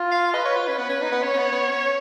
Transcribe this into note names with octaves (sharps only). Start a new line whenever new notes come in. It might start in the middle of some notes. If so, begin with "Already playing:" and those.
Already playing: F4
F5
B4 D#5
C#5
F4
C#4
B3 B4
C#4
D#4
B3
C#4 C#5
C#4
B3
B3
C#4